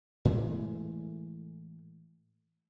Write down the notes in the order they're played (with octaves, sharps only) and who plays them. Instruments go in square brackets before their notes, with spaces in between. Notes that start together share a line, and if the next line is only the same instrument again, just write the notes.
[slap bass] A2 E3 G#3 A3